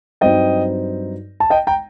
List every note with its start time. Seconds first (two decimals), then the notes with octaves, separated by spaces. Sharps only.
0.21 G2 F#3 C4 D#4 D#5 G5
1.40 A5
1.50 D#5 G5
1.67 G5 A#5